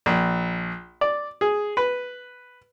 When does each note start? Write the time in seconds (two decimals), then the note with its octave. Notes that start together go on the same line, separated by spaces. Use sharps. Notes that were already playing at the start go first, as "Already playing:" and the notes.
0.06 A#1
1.01 D5
1.41 G#4
1.77 B4